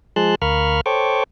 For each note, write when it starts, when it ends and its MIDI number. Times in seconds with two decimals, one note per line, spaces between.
0.16 0.35 53
0.16 0.35 56
0.16 0.35 68
0.16 0.35 81
0.16 0.35 84
0.16 0.35 90
0.42 0.81 38
0.42 0.81 70
0.42 0.81 77
0.42 0.81 83
0.42 0.81 85
0.42 0.81 89
0.86 1.24 69
0.86 1.24 72
0.86 1.24 73
0.86 1.24 79
0.86 1.24 85
0.86 1.24 86